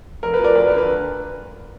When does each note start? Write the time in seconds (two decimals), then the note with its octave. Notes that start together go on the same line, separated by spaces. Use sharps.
0.23 F1 A#4
0.34 B4
0.39 F3
0.44 A#4 D5
0.55 D2 B4
0.67 A#4
0.72 D3
0.78 B4